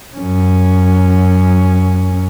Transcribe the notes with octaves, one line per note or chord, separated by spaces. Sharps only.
F#2 C#4